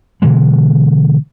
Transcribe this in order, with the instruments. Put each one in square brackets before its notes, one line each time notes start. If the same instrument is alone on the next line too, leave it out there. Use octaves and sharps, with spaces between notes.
[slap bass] B2 D3 E3 G#3